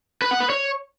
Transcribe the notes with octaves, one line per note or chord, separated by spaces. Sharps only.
B4
F#5
B4
C#5